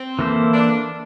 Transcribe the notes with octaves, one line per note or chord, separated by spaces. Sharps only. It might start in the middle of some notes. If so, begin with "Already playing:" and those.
Already playing: C4
E3 A#3 E4 A4 C5
D4